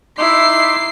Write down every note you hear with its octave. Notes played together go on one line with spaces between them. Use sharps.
D#4 E4 C6 D6 C7